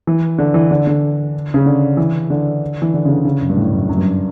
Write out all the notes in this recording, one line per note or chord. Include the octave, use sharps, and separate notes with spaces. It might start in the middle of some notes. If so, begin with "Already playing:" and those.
E3
D3
E3
D3
D3
C#3
D3
E3
D3
E3
D3
C#3
D3
C#3
F#2
G2
A2
F#2
F#2
G2